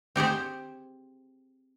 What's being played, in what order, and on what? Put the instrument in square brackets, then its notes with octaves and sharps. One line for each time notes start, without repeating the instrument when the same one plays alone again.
[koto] C4 G4 G#4 C5